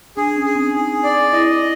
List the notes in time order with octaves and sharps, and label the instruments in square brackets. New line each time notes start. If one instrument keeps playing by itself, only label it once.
[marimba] D4 [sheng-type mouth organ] G#4
[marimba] C#4
[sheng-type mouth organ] G#4
[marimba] C4
[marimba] D#4 [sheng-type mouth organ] G#4
[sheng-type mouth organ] D5
[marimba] E4 [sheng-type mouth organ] D#5